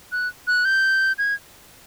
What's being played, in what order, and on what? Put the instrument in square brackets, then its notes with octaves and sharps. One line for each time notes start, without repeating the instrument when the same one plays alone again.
[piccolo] F#6
F#6
G6
G#6